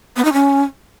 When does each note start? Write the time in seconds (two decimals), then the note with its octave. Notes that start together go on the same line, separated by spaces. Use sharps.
0.16 B3
0.25 D#4
0.33 C#4